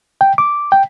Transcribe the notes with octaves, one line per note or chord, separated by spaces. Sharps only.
G5
D6
G5